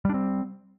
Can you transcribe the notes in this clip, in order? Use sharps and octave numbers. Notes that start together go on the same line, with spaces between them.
G3 C4 D4